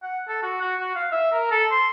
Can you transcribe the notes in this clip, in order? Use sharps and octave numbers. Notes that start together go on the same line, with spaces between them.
F#5
A4
F#4
F#4
F#4
F5
E5
A#4
A4
C6